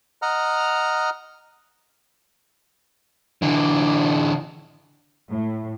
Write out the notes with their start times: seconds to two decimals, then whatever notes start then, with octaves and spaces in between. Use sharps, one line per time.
0.22 D#5 F#5 A#5 F6
3.42 D3 E3
5.30 A2